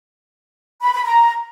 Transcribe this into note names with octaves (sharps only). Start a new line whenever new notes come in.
B5
B5
A#5